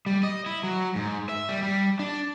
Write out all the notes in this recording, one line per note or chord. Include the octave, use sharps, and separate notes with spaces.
G3
D#5
E4
F#3
G#2
E5
G3
G3
D4